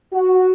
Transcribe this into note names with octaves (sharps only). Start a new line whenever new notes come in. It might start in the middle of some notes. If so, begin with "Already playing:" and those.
F#4